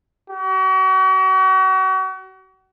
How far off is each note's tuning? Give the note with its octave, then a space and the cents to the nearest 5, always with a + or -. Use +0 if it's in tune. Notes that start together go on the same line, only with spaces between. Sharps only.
F#4 +40